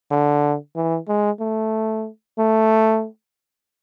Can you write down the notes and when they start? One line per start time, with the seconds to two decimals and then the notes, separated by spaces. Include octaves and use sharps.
0.11 D3
0.76 E3
1.08 G#3
1.40 A3
2.38 A3